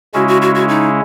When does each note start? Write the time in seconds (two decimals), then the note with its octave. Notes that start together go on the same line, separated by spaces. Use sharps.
0.14 C#3 G#3 C#4 E4 F#4
0.28 F#4
0.42 F#4
0.55 F#4
0.69 D#4